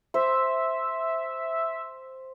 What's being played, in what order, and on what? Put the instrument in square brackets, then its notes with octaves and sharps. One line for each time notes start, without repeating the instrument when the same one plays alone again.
[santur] C5 [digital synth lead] E5